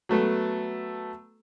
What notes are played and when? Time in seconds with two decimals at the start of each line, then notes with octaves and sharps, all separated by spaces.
0.09 F#3 A3 B3 A4